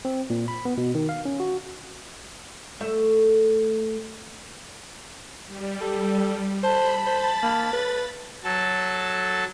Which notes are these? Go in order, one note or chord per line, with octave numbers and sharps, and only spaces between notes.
C4
A#2
B5
B3
B2
D#3
F5
C#4
F#4
A3 E5
G3
A4
C5 A5 B5
C5 B5 A6
A#3
B4
F#3 A4 A5